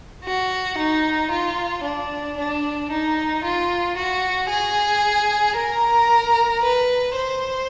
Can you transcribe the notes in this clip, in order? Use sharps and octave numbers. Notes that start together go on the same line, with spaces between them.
F#4
D#4
F4
D4
D4
D#4
F4
F#4
G#4
A#4
B4
C5